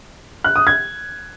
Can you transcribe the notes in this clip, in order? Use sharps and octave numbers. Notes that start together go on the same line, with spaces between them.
F#6
D#6
G#6